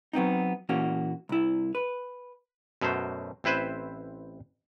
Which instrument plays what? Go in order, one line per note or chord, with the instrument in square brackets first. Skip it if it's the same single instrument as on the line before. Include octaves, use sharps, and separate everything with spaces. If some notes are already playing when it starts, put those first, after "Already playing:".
[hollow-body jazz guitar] F#3 B3 C4 D#4
A#2 E3 A#3 C#4 F#4
C2 E4
B4
[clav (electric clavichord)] F#2 B2 F#3 A3 C5
A1 C4 E4 B4 C5 E5